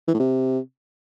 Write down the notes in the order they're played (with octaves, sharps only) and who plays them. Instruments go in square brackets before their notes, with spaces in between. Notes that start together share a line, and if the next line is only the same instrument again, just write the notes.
[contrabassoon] E3
A2
C3